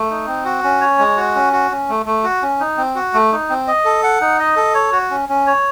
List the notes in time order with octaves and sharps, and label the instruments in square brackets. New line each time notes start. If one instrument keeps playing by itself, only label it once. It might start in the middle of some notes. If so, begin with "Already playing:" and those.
Already playing: [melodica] A3
D#4
C4
F#4
C#4
C#5
G#3
F#4
C#4
F#4
C#4
A3
A3
F#4
C#4
D#4
C4
F#4
A3
D#4
C4
D#5
A4
F#5
D#4
D#5
A4
C#5
F#4
C#4
C#4
C#5